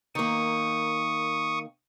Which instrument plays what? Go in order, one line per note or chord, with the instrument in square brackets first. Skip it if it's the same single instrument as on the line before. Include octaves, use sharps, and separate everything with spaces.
[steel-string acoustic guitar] D#3 A#3 [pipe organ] C#6 D#6